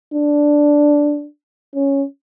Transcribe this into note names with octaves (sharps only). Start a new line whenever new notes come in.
D4
C#4